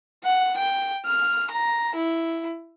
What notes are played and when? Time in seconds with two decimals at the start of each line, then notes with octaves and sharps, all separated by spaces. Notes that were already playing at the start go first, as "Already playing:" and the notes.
0.24 F#5
0.57 G5
1.06 F6
1.51 A#5
1.95 E4